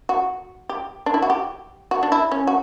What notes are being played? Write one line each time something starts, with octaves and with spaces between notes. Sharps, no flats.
F#4
G4
D4
E4
F#4
G4
F#4
D4
E4
C#4
F#4